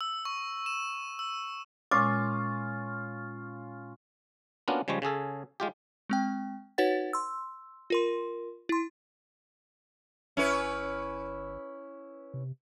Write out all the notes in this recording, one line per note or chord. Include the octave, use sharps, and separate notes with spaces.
E6
C#6
E7
E6
A#2 G#3 C#4 F4 D6 E6
A#3 B3 C#4 D4 F4 F#4
C#3 F3 G3 G#3 C#5
C#3 C#4 G#4 A4
G#3 F4 G4
G#3 C4 G5
D#4 F#4 B4 C#5 F#5 A6
C6 E6
F4 A#4 C6
E4 C6
G1 C#4 E4 B4
C3